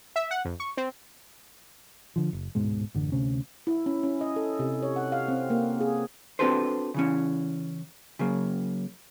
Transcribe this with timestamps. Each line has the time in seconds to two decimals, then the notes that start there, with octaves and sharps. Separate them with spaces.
0.16 E5
0.31 F#5
0.45 F2
0.60 C#6
0.77 C4
2.16 D3 F3
2.33 F#1
2.55 D1 G#2 B2 G#3
2.94 A1 F#2 D3
3.12 D2 C3 C#4
3.67 E4
3.86 C#4
4.03 C#4
4.21 D#5
4.36 A4
4.59 C3
4.83 C#5
4.96 F#5
5.12 F5
5.28 C4
5.50 A#3
5.81 G#4
6.39 C4 D4 F#4 A4 B4 C5
6.94 C#3 E3 C#4
8.19 C#3 F#3 A#3